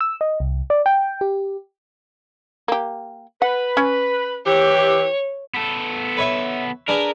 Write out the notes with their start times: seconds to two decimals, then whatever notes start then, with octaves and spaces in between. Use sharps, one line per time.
0.01 E6
0.21 D#5
0.40 C2
0.70 D5
0.86 G5
1.21 G4
2.68 A#3 G4
3.42 B4 F#5
3.77 C#4
4.45 E3 G4 C#5
5.55 B3 A4
6.17 B4 C#5 E5
6.88 D4 G#4 A#4 B4